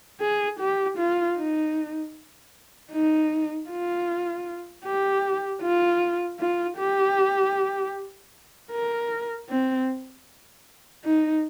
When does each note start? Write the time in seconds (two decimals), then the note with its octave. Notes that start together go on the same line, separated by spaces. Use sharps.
0.21 G#4
0.59 G4
0.98 F4
1.37 D#4
2.92 D#4
3.69 F4
4.84 G4
5.62 F4
6.39 F4
6.78 G4
8.71 A#4
9.49 C4
11.04 D#4